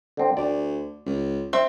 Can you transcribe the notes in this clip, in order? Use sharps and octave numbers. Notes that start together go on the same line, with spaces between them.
D3 C4
D2 D5
C#2
C4 E5